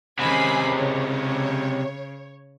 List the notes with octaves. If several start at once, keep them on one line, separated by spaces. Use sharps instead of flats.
C3 D#3 G#3 C#4 G#5 B5 C7
C#3 C#5